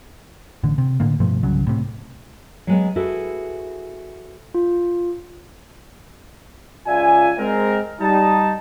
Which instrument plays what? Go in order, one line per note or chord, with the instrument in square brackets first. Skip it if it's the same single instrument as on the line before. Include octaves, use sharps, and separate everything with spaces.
[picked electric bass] A1 D3
C3
A2 D3 A#3
G2 B2 F3 A3
G1 C2 C#3 F#3
A2 C3
[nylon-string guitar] F#3 G#3 B3
E4 F#4 G#4 A4 B4
[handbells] F4
[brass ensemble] C#2 F4 D5 E5 G#5
G#3 C4 A#4
G3 D#4 A5